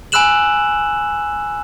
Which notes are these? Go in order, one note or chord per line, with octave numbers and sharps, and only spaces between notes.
G#5 B5 E6 F#6 E7 F#7